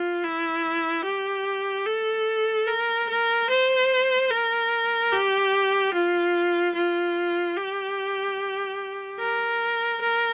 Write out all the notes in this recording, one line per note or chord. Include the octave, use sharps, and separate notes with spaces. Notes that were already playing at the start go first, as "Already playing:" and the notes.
Already playing: F4
E4
G4
A4
A#4
A#4
C5
A#4
G4
F4
F4
G4
A#4
A#4